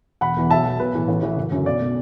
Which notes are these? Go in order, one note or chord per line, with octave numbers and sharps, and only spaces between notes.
E1 F#5 B5
E2 E3
B1 E5 A5
B2
B1 B4
A2 E3
A1
A2 E3
F#1
F#2 D3
B1 D5
B2